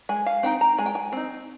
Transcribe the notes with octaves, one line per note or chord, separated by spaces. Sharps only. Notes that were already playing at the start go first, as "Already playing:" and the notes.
G#3 G#5
F5
C4 D#4 G5
A#5
G#3 G#5
G5
G#5
C4 D#4